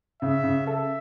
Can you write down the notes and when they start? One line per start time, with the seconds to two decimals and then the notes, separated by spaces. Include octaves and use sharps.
0.22 C#3 E5
0.43 C#3
0.67 A4 E5